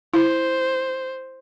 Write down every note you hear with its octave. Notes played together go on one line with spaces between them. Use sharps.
E4 C5